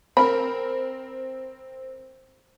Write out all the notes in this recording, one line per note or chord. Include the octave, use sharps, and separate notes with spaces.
C4 A#4 B5